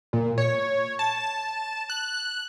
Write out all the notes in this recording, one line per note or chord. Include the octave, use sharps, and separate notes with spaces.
A#2
C#5
A5
F#6